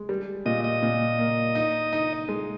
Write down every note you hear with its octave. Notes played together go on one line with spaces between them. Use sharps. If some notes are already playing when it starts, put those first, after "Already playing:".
Already playing: G#3
G3
A#2 D#5
D#5
A#2
A#3
D#4
D#4
G#3